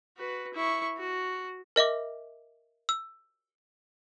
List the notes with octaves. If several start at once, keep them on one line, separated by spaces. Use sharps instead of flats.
F#4 B4
E4 C#6
F#4
A#4 D#5 E5 D6
E6